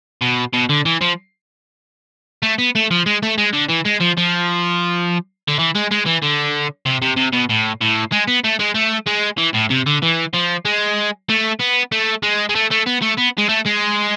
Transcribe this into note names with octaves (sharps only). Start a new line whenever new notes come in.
B2
B2
D3
E3
F3
A3
B3
A3
F3
G#3
A3
G#3
D3
E3
G#3
F3
F3
D3
E3
G#3
G#3
E3
D3
C3
C3
C3
B2
A2
A2
G#3
B3
A3
G#3
A3
G#3
E3
A2
C3
D3
E3
F3
G#3
A3
B3
A3
G#3
G#3
A3
A3
B3
A3
B3
G#3
A3
G#3